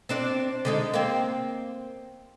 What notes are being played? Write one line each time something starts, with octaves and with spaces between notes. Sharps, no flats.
C4 D4 D5
D3 G#3 D#4
A#3 C4